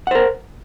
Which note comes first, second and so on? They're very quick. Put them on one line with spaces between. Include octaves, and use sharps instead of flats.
F#5 C5 A#4